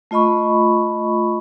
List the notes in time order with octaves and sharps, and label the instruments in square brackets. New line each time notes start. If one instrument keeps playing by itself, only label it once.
[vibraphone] A3 F4 D#5 B5 C#6